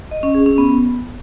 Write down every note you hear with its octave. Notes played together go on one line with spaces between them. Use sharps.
D#5
C#4
G#4
C#4
B3